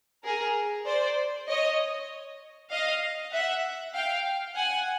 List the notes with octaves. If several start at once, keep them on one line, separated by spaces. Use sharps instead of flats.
G#4 A#4
C5 D5
C#5 D#5
D#5 F5
E5 F#5
F5 G5
F#5 G#5